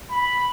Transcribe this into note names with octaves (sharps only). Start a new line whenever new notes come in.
B5